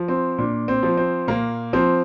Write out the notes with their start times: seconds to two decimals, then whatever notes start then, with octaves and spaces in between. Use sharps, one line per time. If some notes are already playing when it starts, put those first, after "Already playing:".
Already playing: F3
0.08 C4
0.38 A#2 D4
0.68 C4
0.83 F3
0.97 C4
1.27 A#2 A#3
1.73 F3 C4